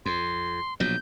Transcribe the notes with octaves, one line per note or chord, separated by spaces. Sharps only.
F2 C6
A#1 B2 F#3 G6